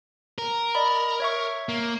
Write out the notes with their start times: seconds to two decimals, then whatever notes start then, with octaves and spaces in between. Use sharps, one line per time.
0.38 A#4
0.75 D5 D#5 B5
1.20 C#5 E5 C#6
1.69 A#3